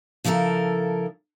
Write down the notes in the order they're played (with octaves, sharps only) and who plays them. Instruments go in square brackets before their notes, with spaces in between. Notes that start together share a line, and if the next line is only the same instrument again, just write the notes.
[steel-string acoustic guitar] C#3 F3 E4 A4 A#4